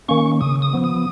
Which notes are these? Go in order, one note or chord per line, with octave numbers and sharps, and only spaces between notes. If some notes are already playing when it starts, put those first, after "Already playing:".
D#3 A#3 C#4 C#6
C#3 D#6
D#6
F3 B3
D#6